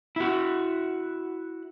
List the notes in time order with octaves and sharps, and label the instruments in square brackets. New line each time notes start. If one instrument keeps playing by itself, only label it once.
[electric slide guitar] E4 F#4